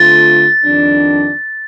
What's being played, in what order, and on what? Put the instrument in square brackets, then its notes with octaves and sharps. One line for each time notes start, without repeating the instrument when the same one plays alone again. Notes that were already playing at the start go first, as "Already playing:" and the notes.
Already playing: [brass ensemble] D3 A3 C4 F4 [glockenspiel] A6
[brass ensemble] F2 D#3 G3 D4